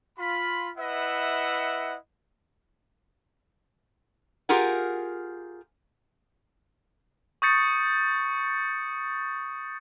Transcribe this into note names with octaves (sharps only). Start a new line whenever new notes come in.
F4 B5
E4 B4 D#5 E5 F#5
F4 G4 G#4 A#4 F#5
C#6 D#6 G6 A6 C#7